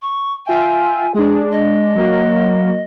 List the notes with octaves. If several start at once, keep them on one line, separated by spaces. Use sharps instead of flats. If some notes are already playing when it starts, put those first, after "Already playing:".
C#6
F4 E5 G5 G#5
G#3 D4 G#4
D#5
F#3 A#3 F#4